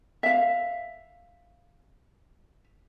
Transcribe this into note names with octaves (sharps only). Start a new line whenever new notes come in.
E5 F5